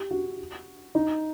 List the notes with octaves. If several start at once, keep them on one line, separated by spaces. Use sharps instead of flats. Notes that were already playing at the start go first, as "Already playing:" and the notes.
Already playing: G4
F#4
D#4